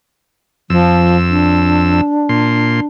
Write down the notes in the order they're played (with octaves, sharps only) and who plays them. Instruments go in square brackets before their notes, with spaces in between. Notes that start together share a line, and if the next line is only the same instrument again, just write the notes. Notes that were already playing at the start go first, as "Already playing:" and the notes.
[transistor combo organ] F2 E6 [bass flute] F3
[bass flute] D4
[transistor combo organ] A#2 C6